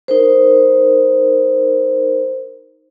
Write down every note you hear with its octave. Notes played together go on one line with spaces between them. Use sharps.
D#4 A#4 C5